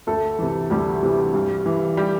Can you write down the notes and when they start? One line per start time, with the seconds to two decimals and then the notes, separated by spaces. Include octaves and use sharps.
0.07 D2 A3 A4
0.39 C3 E3
0.70 D2 G3 G4
1.02 C3 E3
1.34 G2
1.66 E3
1.97 G3 G4